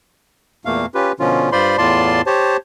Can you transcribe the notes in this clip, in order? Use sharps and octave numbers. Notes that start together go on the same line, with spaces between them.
E2 A#2 A3 A#3 F5
C#4 F4 G4 B4
B2 D3 F3 C#4 F4
G2 F4 C5 D5 B5 C6
E2 A2 F4 D5 A5 C6
G4 C5 C#5 A5